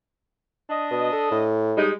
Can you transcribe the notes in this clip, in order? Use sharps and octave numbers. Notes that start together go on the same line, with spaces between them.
D4 D#5
B2
A4
A2
G3 G#3 D#4